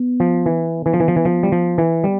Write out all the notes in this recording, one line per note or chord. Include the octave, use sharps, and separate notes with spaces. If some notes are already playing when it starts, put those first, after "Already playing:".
Already playing: B3
F3
E3
E3
F3
E3
F3
E3
F3
G3
F3
E3
G3